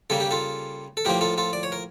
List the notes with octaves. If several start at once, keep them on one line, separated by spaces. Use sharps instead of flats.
C#3 G3 A#3 A4
G4
F4 A4
A4
A2 F3 A#3 G4 A#4
F4 A4
F4 A4
D5
C#5
A#4